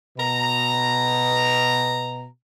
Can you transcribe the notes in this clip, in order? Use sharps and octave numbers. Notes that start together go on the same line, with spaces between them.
B2 A#5